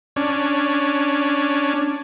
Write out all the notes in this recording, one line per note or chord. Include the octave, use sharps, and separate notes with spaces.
C#4 D4